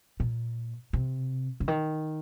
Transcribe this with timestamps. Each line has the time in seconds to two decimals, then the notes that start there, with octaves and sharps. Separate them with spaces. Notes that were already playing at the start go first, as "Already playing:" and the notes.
0.20 A#2
0.93 C3
1.60 C#3
1.68 D#3